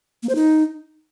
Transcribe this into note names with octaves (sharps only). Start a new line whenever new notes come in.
A#3
C5
D#4